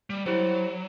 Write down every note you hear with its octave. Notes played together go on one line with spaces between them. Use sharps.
G3
F#3 E4 G4 C5